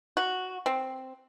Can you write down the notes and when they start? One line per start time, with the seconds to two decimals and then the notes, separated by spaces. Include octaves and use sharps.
0.17 F#4
0.66 C4